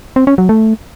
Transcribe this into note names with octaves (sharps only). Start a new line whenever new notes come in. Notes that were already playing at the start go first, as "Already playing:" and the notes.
C4
C#4
F#3
A3